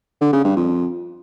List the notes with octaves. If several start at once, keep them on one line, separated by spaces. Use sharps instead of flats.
D3
C#3
G2
F2